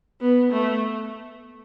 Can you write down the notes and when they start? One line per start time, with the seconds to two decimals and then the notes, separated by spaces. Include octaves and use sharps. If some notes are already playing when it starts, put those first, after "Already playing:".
0.21 B3
0.53 A3